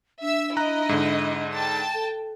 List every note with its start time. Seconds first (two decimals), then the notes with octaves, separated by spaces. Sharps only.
0.21 D4 E5 E6
0.57 E4 D#5 A#5 F#6
0.89 G#2 D3
1.54 G5 A5
1.94 A4